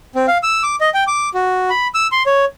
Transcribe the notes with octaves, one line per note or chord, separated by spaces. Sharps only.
C4
F5
E6
D6
D#5
G5
D6
F#4
B5
E6
C6
C#5